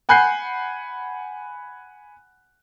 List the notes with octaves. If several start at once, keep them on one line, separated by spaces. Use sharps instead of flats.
F#5 G#5 B5 F#6 G6 C7